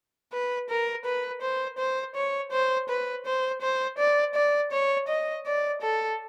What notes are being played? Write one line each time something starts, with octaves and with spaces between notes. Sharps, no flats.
B4
A#4
B4
C5
C5
C#5
C5
B4
C5
C5
D5
D5
C#5
D#5
D5
A4